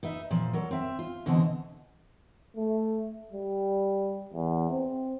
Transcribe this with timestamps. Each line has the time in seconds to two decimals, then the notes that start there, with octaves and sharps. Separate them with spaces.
0.03 D#4 B4 E5
0.31 A#2 F3
0.53 F#3 A4 A#4
0.71 C4 E5
0.99 F4
1.26 B2 D3 E3 C4 D#5
2.57 A3
3.33 G3
4.33 E2
4.71 C4